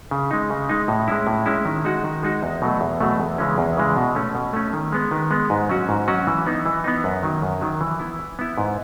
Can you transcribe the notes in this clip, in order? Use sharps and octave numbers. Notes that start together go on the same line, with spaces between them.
C#3
G#3 D#4
C#3
G#3 D#4
A2
G#3 C#4 E4
A2
G#3 C#4 E4
D#3
G#3 D#4 F#4
D#3
G#3 D#4 F#4
E2
B2 F#3 A3
E2
B2 F#3 A3
E2
C#3 E3 G#3 C#4
E2
C#3 E3 G#3 C#4
B2
A3 C#4
B2
A3 C#4
D#3
G#3 B3
D#3
G#3 B3
G#2
F#3 C#4 F#4
G#2
F#3 C#4 F#4
E3
B3 D#4
E3
B3 D#4
F#2
D#3 F#3
F#2
D#3 F#3
E3
B3 E4
E3
B3 E4
G#2